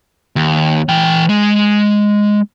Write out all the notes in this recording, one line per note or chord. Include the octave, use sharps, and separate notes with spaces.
D#2
E3 G5
G#3